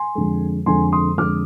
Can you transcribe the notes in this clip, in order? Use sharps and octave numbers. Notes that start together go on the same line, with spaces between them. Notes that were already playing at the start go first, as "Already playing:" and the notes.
Already playing: G#5 C6
F2 D3 G#3
F2 D3 G#3 G#5 C6
C6 D#6
F2 D3 G#3 D6 F6